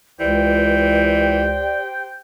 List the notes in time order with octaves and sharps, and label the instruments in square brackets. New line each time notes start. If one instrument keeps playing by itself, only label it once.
[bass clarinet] C#2 [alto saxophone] E3 [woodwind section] G4 C5 G5 [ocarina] D5